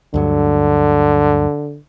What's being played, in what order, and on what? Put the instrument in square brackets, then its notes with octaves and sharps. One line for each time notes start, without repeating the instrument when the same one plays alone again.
[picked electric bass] D2 G2 F#3 [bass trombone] D3